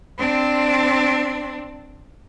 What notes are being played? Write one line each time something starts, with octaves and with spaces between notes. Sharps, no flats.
C4 D4